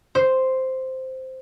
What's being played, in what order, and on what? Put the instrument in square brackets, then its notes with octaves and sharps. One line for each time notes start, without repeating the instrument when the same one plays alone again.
[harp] C5